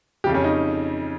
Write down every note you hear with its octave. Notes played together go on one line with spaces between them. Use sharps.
F2 C#3 F3 G4
C#4
D#4